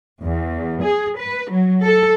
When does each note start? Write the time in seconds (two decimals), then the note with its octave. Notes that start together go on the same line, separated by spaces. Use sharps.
0.22 E2
0.82 G#4
1.17 B4
1.51 F#3
1.84 A4